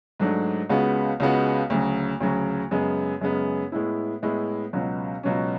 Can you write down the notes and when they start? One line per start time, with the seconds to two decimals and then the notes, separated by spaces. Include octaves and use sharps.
0.20 G#2 F#3 A3 D4
0.70 C#2 C#3 G#3 B3 F#4
1.20 C#2 C#3 G#3 B3 F#4
1.70 D2 C#3 F#3
2.21 D2 C#3 F#3
2.71 F#2 C#3 G#3 B3
3.21 F#2 C#3 G#3 B3
3.72 A2 G#3 B3 E4
4.23 A2 G#3 B3 E4
4.73 C#2 B2 F#3 C#4
5.23 C#2 B2 F#3 C#4